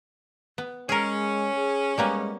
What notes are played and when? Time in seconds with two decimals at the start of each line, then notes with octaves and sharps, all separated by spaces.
0.58 B3
0.89 G#3 C#4 G#4 A#4
1.55 G#4
1.98 G3 G#3 A#3 B3